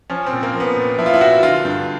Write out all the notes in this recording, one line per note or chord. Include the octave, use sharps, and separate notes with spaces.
F3 C#4
C4
A#2
A#3
F3
B3
A#2
F3 E4
F4
E4
A#2 F#4
D3 F4
G2